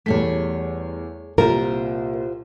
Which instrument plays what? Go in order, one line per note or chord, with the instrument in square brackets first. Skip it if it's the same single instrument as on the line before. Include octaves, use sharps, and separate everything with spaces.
[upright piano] E2 G3 B6 [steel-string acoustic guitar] A3 G#4 C#5
[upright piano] C2 A#2 [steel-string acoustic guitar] F4 G4 C5 [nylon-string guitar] A#4